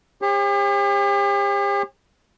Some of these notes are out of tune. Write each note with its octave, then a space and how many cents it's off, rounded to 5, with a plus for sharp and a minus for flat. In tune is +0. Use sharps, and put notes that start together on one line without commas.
G4 +40 C#5 -45